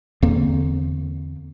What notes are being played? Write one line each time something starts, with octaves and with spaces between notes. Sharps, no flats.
E2 D3 A#3 C4